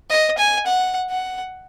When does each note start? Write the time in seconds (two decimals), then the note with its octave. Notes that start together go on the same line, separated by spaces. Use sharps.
0.10 D#5
0.38 G#5
0.66 F#5
1.10 F#5